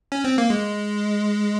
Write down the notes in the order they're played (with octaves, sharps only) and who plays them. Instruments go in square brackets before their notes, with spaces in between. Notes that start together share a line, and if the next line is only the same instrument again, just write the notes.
[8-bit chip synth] C#4
C4
A#3
G#3